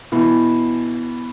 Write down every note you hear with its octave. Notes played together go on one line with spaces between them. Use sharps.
B2 E3